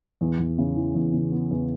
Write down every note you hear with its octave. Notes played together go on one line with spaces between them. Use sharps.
E2
E2
C#3
E3
E2
C#3
B3
E2